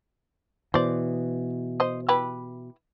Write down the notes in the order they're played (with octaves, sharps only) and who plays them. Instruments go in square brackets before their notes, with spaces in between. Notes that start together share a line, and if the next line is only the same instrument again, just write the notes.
[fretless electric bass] B2 E3 [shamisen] C5 D5
[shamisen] C5 D#5
E4 G4 B4